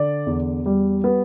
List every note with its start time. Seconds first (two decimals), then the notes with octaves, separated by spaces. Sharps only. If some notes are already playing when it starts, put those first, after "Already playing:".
Already playing: D3 D5
0.27 E2
0.66 G3
1.04 B3